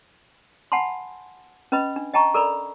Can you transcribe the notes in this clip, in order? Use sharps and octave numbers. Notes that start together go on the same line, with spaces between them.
F#5 G#5 A5 B5 C6
C#4 B4 D#5 B5
D4
D#5 G5 A5 A#5 C#6
A4 A#4 D5 A#5 B5